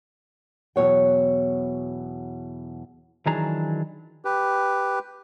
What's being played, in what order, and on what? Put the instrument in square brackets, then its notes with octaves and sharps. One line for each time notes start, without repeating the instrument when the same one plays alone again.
[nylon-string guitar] E2 B2 F#3 C#5 F#5 G5
[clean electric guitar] D#3 E3 F#3 D4 G#4 A#5
[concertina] G4 B4